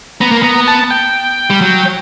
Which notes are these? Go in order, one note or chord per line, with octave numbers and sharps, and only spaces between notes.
B3 A#5
A#3
B3 A#5
A5
G5
G3
F#3